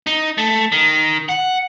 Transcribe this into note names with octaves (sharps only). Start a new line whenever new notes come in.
D#4
A3
D#3
F#5